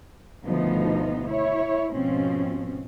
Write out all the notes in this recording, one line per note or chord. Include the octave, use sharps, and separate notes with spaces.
D2 B2 D#3 F3 B3 D#4
E4 C#5
G#2 B2 F3 C4 C#4